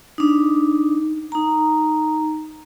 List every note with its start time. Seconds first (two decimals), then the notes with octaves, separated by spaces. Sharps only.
0.18 D4 D#4
1.32 D#4 A#5